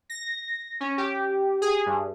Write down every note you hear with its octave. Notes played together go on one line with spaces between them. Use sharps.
A#6
C#4
G4
G#4
G2